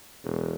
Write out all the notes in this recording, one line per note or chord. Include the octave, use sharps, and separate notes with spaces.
E1